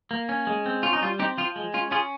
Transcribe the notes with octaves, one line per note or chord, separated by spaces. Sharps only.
A#3
C#4
G#3
C4
C#4 F4
D#4
G3 F4
C4 D#4 G4
F3 F4
G#3
C#4 F4
C#4 F4 G#4